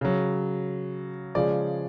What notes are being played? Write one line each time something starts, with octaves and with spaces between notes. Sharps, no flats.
C#3 F#3
C#3 F3 G#3 D5